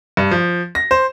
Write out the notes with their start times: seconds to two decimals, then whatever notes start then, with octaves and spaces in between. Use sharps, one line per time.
0.17 G2
0.31 F3
0.75 A#6
0.91 C5